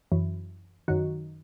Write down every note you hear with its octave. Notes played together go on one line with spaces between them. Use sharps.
F#2 E3
F#2 D#3 F#4